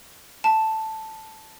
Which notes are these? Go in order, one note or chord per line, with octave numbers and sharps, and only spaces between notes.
A5